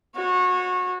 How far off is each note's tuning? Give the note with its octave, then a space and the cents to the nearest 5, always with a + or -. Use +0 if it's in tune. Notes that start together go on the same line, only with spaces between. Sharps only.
F#4 -25 C#5 -20